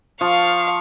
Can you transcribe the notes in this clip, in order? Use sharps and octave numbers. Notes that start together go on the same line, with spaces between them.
F3 F5 C#6